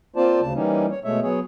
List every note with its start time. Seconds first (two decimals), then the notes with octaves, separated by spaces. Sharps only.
0.16 A#3 C4 F4 C5 D5 A5
0.41 D2 C#3 A5
0.55 E3 G3 A#3 C#4 D#4
0.91 C#5
1.04 B2 G#3 A3 C#5 E5
1.23 F#3 B3 G#4 C#5